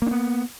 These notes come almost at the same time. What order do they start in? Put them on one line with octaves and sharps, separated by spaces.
A#3 D4 B3